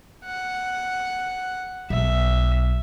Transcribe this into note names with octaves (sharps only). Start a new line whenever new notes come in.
F#5
B1 E5